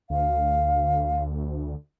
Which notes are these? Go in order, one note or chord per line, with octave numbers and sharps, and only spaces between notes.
D2 F5